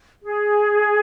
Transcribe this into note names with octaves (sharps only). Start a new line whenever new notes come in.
G#4